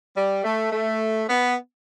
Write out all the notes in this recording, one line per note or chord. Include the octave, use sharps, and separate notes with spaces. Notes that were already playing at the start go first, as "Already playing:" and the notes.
G3
A3
A3
B3